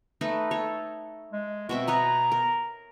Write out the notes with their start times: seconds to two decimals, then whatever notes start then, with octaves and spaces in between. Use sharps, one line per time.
0.21 A3 D#4 B4
0.51 A4 C#5
1.33 G#3
1.69 B2 C4 F#4 E5
1.88 B4 C#5 D#5 A#5
2.32 A#4